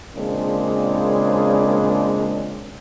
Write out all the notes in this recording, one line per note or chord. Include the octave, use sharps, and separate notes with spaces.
A#2 C#3 G#3 A#3 C4 D4